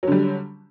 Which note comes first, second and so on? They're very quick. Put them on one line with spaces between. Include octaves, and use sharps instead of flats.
F#3 D3 G3